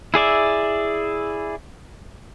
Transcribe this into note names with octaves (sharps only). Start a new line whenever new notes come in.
E4 G#4 D5 E5